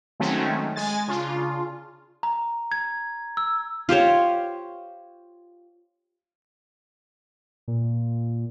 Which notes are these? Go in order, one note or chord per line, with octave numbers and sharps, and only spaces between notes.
D#3 F#3 G#3 A3 C4 C#4
G#3 G#5 A6
C#3 D4 F4
A#5
G#6
E6
F4 G4 C5 C#5
A#2